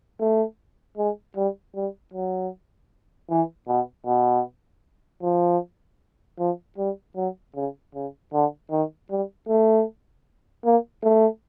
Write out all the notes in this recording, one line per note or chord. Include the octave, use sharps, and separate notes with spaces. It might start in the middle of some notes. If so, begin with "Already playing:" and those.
A3
G#3
G3
G3
F#3
E3
B2
B2
F3
F3
G3
F#3
C#3
C#3
D3
D#3
G3
A3
A#3
A3